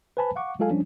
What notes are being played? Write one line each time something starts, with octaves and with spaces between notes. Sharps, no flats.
B4 C5 G#5 A5 B5
F5 F#5 C#6 D6
F#3 G#3 F4 A4 F5 G#5
F3 G3 C#4 D4